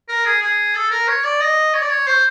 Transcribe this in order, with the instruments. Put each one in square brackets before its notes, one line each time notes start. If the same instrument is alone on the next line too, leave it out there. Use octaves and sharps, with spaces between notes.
[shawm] A#4
G#4
G#4
A4
A#4
C#5
D5
D#5
C#5
D5
C#5
C5